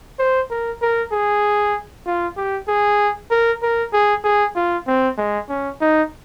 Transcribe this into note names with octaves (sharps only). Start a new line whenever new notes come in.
C5
A#4
A#4
G#4
F4
G4
G#4
A#4
A#4
G#4
G#4
F4
C4
G#3
C#4
D#4